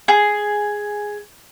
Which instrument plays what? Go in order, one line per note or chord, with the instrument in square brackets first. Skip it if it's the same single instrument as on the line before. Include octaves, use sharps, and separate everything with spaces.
[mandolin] G#4